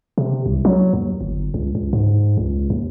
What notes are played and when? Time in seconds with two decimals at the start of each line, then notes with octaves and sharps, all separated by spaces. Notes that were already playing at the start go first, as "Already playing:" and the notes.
0.18 C3
0.46 C2
0.65 F#3
0.93 D#2
1.21 G1
1.54 C#2
1.75 C#2
1.93 G#2
2.38 C#2
2.70 D#2